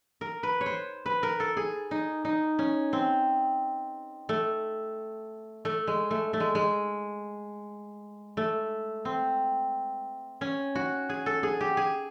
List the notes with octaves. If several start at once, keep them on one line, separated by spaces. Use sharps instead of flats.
A#4
B4
C#5
C5
B4
A#4
A4
G#4
D#4
D#4
C#4
C4
A3
A3
G#3
A3
A3
G#3
G#3
A3
C4
C#4
F#4
G#4
A4
G#4
G4
G#4